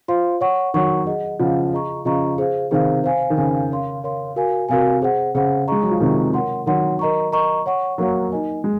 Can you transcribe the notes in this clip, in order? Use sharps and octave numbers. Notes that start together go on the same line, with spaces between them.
F4 C5 F5 C6
C#5 F#5 C#6
D#3 F#3 C#5 F#5 C#6
G#4 D#5 F#5
C#3 F3 G#4 D#5 F#5
G#4 D#5 A#5 C#6
C#3 F3 G#4 D#5 A#5 C#6
G#4 C5 F5
C3 D#3 G#4 C5 F5
C5 F5 G#5
D#3
C#3 C5 F5 G#5
A#4 C#5 F5 C6
A#4 C#5 F5 C6
F#4 A#4 F5 G#5
C3 F#4 A#4 F5 G#5
G#4 C5 F#5
C#3 G#4 C5 F#5
G#3 G#4 D#5 A#5 C#6
F#3
F3
C3 D#3 G#4 D#5 A#5 C#6
A#4 C#5 F#5 C6
D#3 F#3 A#4 C#5 F#5 C6
A#4 D#5 A#5 C#6
A#4 D#5 A#5 C#6
C#5 F#5 C#6
F#3 A#3 C#5 F#5 C#6
D#4 A#4 D#5 G#5
G#3